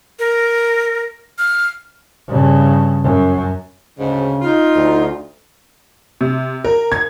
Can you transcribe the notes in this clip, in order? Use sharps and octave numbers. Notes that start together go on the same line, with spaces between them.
A#4
F6
G2 C#3
F#2
D2 G#2 C#3
D#4 F4
D2
C3
A#4
G#6